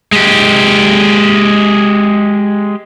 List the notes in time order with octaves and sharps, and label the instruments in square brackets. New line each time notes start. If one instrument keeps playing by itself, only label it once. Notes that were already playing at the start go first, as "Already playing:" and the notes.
[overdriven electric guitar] G#3 G4